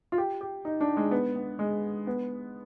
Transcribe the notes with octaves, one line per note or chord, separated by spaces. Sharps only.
F4
G4
G4
D#4
D4
G#3
B3
B3
G#3
B3